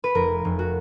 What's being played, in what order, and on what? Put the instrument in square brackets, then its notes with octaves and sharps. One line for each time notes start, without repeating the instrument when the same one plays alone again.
[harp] B4
F1 A#4
F1
F#4